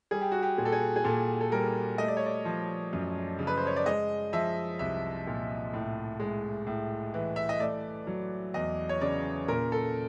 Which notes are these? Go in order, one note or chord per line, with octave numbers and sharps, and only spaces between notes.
G3 G#4
G4
F#4
G4
A#2 G#4
A4
G#4
G#4
A#2 A4
A4
G3 A#4
A3 D#5
D5
C#5
D5
F3
F#2
C#3
B4
C5
C#5
D5
G#3 D#5
F3 E5
C2 E5
A#2
A2
G#3
A2
E3
E5
D#5
A3 D5
F#3
E2 D#5
C#5
C#3 D5
A#2 A#4
A4